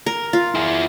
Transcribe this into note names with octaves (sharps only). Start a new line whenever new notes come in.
A#4
F4
E4 G#4